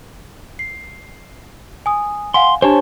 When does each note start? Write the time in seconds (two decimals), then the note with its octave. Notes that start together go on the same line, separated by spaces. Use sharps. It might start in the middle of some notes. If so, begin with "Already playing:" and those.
0.59 C7
1.86 G#5 D#6
2.34 F5 F#5 G#5 C6
2.62 D4 G4 C5 C#5 G#5 A5